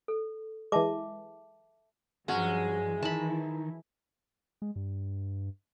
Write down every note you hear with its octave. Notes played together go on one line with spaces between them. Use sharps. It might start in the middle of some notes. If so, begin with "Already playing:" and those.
A4
E3 G#3 E5 A5 D6
G2 F3 F#3 G#3 C#4
D#3 E3 D#4 E4 A5 B5
G#3
G2